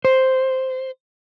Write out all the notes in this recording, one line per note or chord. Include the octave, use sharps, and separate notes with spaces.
C5